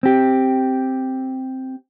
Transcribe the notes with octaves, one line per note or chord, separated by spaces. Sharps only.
C4 G4